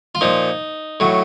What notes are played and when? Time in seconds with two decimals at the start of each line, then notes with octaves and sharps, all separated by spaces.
0.15 F4
0.21 A#2 F3 D#4
1.00 A2 F#3